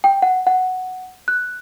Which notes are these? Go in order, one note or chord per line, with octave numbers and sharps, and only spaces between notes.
G5
F#5
F#5
F#6